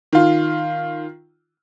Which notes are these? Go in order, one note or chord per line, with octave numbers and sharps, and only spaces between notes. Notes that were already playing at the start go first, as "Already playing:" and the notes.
D#3 F4